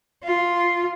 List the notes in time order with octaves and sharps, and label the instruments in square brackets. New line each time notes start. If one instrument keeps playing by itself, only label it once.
[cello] F4